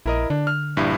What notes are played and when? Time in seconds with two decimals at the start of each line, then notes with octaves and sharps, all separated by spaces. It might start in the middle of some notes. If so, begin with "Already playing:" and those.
0.06 A#1 E4 A#4 D#5
0.30 D3 D4
0.47 F6
0.77 A#1 G2 E4